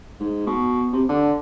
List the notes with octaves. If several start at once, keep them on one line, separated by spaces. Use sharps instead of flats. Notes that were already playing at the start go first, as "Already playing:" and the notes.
G#2
B2
C3
D3